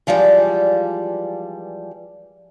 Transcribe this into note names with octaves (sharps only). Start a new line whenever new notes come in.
E3 F3 G3 G#3 D5